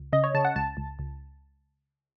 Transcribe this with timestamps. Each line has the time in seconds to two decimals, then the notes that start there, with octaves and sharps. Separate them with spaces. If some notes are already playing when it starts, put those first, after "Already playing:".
Already playing: C#2
0.13 C#3 D#5
0.24 C#5
0.34 C#3 A5
0.45 F#5
0.55 C#2 A5
0.77 C#2
0.99 C#2